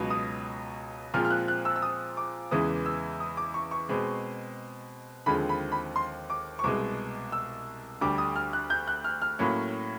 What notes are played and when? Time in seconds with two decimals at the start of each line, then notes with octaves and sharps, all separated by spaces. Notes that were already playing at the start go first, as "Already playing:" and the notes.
Already playing: C#2 B2 F#3
0.10 D#6
1.14 A#2 F3 G#3 C4 F6
1.25 F6
1.30 F#6
1.48 F#6
1.65 E6
1.76 E6
1.82 D#6
2.17 D6
2.51 E2 C#3 E3 G#3 B3 D#6
2.86 E6
3.20 D#6
3.37 D6
3.54 C#6
3.71 C#6
3.89 B2 G#3 C4
5.26 D#2 D3 F3 G#3 C4 B5
5.49 B5
5.72 B5
5.96 C6
6.30 D6
6.59 C#6
6.64 C2 B2 G#3 D6
7.32 E6
8.01 D2 D3 G3 D6
8.18 D#6
8.36 F6
8.53 F#6
8.70 G6
8.88 F#6
9.04 F6
9.22 F6
9.39 A2 F#3 A#3 C#4